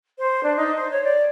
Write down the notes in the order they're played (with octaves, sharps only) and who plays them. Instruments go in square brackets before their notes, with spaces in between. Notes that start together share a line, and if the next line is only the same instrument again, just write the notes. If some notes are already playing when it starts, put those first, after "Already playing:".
[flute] C5
D4
D#4
C5
C#5
D5